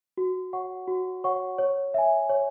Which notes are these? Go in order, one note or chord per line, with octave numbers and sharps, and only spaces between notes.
F#4
C#5 F#5 C#6
F#4
C#5 F#5 C#6
C#5
E5 G#5
C#5